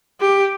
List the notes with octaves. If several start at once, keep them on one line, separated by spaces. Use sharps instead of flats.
G4